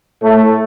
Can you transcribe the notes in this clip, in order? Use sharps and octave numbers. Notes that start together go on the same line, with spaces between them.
A2 A3